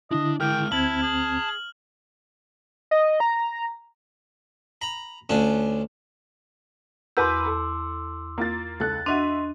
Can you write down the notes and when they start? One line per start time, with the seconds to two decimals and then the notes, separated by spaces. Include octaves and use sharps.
0.11 D3 D4 E4 D#5
0.40 G#3 A#4 G5 F6
0.72 D2 C4 E4 A5 G#6 F#7
1.02 G#4
2.91 D#5
3.20 A#5
4.82 A#5 B5
5.29 D2 C#4 D4 F4
7.17 E2 F#4 A#4 B4 C6 D6 E6 G6
7.46 A4
8.38 A#3 F4 A6
8.80 C#2 A4 F#6 A6
9.06 D4 F#4 D#5 E5 C6 D#7